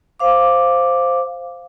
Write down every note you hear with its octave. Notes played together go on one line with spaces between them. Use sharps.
C5 F5 D6